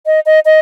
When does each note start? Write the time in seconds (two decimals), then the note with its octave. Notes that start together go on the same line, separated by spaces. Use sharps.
0.06 D#5
0.26 D#5
0.45 D#5